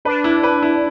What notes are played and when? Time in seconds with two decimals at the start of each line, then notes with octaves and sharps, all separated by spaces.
0.05 D4 B4
0.24 E4
0.43 B4
0.63 E4